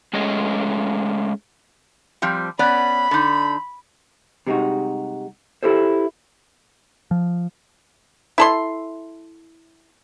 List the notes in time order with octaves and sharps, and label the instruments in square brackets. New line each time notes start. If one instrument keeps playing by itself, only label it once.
[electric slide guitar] G#3 A3 C#4 G#4 D#5
[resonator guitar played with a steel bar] F3 G3 C4
[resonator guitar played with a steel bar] B3 C#4 D5 [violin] B5
[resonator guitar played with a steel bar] D3 D#4
[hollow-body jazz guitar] C3 G3 G#3 C4 D#4 F#4
E4 G4 A4 C5
[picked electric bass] F3
[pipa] E4 A4 C6